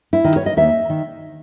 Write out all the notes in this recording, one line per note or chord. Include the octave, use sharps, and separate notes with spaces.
E4
D#3
C#5
D#5
D#2 E5
D#3